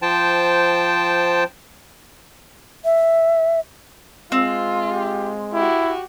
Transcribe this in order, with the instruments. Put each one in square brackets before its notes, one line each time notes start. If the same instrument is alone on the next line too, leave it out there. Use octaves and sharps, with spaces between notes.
[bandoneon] F3 C5 G5 A5
[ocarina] E5
[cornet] G#3 [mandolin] C4 [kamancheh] F4
[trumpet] G4
[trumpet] E4 [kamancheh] F#4 G4